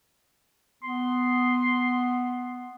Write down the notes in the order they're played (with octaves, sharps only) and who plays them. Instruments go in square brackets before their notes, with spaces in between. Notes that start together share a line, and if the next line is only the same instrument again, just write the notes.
[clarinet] B3 [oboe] C6